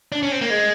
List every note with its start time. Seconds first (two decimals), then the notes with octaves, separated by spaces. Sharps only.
0.12 D4
0.23 C#4
0.32 C4
0.41 A#3
0.50 G#3